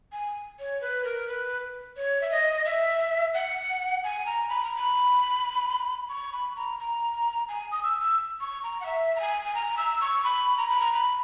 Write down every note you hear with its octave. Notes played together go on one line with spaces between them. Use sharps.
G#5
C#5
B4
A#4
B4
C#5
E5
D#5
E5
F#5
G#5
A#5
B5
A#5
B5
C#6
B5
A#5
A#5
G#5
D#6
E6
E6
C#6
A#5
F#5
E5
A#5
G#5
G#5
A#5
E6
C#6
B5
A#5
B5
A#5
B5